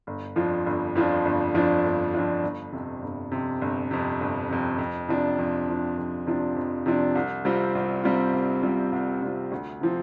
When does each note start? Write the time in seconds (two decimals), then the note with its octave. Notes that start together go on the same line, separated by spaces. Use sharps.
0.07 G1
0.36 F2 F3 D4 F4
0.66 G1
0.95 F2 F3 D4 F4
1.25 G1
1.54 F2 F3 D4 F4
1.84 G1
2.14 F2 F3 D4 F4
2.43 G1
2.72 F2 C3
3.02 G1
3.32 F2 C3
3.61 G1
3.91 F2 C3
4.20 G1
4.50 F2 C3
4.79 F2
5.09 C3 F3 D4
5.39 F2
5.68 C3 F3 D4
5.97 F2
6.27 C3 F3 D4
6.56 F2
6.86 C3 F3 D4
7.15 C2
7.45 C3 G3 C4 F4
7.75 C2
8.04 C3 G3 C4 F4
8.33 C2
8.63 C3 G3 C4 F4
8.92 C2
9.22 C3 G3 C4 F4
9.52 D2
9.81 C3 F3 C4